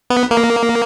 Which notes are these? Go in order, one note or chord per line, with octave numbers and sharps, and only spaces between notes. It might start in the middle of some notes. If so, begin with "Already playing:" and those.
B3
A#3